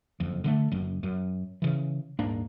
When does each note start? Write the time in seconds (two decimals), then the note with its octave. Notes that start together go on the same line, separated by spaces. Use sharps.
0.20 F#1 F2
0.44 D3 G#3 A3
0.72 F#1 F#2
1.03 F#2
1.62 C#3 E3
2.19 D#1 G#2 A#3 D4